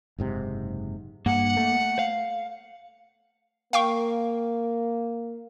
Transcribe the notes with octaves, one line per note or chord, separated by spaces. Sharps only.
F#1 G#2 C3
G2 A#3 F#5
A3
F5
A#3 F5 G5 C#6